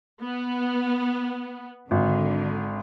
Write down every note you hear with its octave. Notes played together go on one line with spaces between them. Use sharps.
B3
G#1 D3